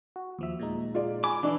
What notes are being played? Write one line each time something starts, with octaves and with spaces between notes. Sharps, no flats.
F#4
D#2 F3 E5
A#2 G#3 D#4
F4 G#4 D5
G#5 B5 D6
E3 D4 E4 D5